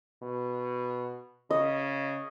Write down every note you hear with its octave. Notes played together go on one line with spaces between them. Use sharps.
B2
C#3 D#5